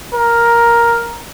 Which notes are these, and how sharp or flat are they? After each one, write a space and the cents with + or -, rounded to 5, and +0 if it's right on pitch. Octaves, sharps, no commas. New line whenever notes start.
A#4 +5